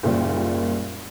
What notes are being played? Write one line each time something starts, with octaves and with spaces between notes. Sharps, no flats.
F#1 A#2 G3